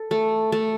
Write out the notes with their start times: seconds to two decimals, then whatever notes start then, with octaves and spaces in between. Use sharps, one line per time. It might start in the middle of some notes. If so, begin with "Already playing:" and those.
Already playing: A4
0.11 A3
0.52 A3